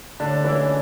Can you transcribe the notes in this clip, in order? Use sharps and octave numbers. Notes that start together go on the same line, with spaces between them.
A2 D3 D4
E3 G#3 C#4 E4 G#4